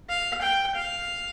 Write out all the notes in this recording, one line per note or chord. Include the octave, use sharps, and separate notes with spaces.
F5
G5
F5